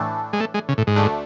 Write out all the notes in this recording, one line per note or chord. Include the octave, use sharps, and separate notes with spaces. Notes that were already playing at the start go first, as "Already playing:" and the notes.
Already playing: A2 E3 A3 D4 A4
G#3
A3
G#3
C#3
A2
G#2
D2 D3 A3 D4